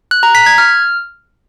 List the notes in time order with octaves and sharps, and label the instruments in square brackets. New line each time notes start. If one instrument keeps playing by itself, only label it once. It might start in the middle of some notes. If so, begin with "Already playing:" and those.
[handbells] F#6
A#5
B6
G#6
F6